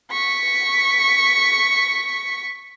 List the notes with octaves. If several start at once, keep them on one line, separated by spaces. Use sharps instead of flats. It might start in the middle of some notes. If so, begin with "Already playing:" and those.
C#6 B6